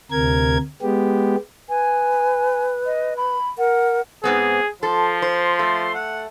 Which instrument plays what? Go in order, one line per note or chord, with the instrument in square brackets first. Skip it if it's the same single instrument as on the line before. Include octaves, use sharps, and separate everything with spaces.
[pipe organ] D2 C3 A#4 G#6
G#3 B3 G4
[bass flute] B4 [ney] G#5
[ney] D#5
B5
[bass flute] A#4 [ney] F#5
[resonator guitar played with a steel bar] G#2 B3 C4 [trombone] G#4
[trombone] F3 [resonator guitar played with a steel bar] A4 [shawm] C6
[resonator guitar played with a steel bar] C5
A3
[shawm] F#5